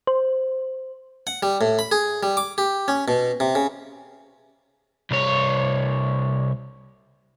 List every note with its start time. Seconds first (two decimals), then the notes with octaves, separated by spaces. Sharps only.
0.07 C5
1.27 F#5
1.43 G3
1.61 A2
1.79 B5
1.92 G#4
2.23 G3
2.37 D6
2.58 G4
2.88 C#4
3.08 B2
3.40 C3
3.55 C#3
5.11 C2 C#5